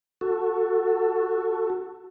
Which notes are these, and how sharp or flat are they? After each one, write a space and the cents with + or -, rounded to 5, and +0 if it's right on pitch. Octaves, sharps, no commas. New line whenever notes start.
F#4 +0 A4 +15